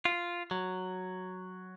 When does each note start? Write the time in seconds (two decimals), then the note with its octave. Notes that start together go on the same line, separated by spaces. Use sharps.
0.05 F4
0.51 F#3